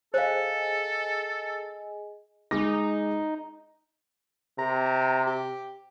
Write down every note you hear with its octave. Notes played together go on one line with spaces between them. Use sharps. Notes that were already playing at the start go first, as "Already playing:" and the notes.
G#4 A4 C5 D#5 F5 G#5
G#3 D#4 D6 A#6
C3 A#5
G4